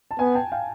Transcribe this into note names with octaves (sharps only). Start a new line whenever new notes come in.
A5
B3 F#5 G#5
G5 A5
F5 G5